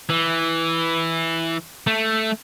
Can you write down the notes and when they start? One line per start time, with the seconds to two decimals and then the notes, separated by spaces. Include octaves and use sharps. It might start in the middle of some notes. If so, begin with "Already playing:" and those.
0.10 E3
1.87 A3